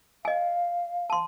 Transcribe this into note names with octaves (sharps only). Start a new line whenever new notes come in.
D#5 F5 G#5
A5 C6